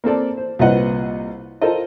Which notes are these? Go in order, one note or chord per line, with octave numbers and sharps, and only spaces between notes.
A#3 C4 A4 D5
C5
C2 A#2 B4 C5 D#5 F#5
F4 A4 A#4 C5 D#5